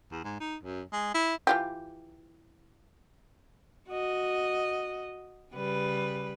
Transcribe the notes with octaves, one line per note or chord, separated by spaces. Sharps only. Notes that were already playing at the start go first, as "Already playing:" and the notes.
E2
G#2
D#4
F#2
G#3
E4
E3 F4 G4
F#4 D#5
C#3 G3 B4